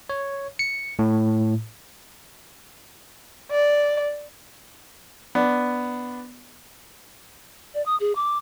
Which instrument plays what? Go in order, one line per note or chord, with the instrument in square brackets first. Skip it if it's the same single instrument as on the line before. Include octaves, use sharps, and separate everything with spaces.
[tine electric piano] C#5
C#7
A2
[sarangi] D5
[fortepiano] B3 D4
[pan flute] D5
D#6
G#4
D6